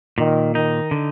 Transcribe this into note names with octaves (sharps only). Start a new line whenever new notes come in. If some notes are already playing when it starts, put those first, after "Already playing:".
A#2 D#3
D#3 D#4
D3